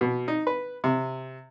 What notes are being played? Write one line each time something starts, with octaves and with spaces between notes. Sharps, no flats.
B2
D#4
B4
C3